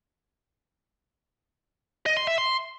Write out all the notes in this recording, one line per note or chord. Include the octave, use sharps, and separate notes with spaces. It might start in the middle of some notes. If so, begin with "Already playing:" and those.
D#5
C6
E5
C6